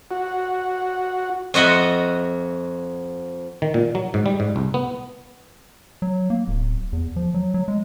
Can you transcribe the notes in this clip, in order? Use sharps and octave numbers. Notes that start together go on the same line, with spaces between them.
F#4
F2 F#4 D#5 E5 F#5
D#3
A#2
F#3
G#2
G3
G#2
C2
B3
F#3
A#3
D1
E2
F3
F#3
F#3
G#3